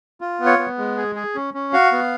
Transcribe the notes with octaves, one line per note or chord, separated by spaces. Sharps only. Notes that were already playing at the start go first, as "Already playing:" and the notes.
F4
B3
C#5
B3
G#3
G#4
G#4
C#4
C#4
F#4 F5
B3